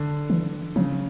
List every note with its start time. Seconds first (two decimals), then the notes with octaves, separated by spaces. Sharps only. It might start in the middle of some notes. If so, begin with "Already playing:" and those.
Already playing: D3
0.30 E3
0.76 C#3 F3